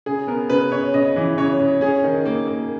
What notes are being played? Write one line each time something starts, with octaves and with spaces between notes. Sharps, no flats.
C#3 G#4
B3 A#4
C#3 B4
C#3 C#5
C#3 D#5
E3
C#3 C#5
C#3
C#4 G#4
D#3
A#3
A#3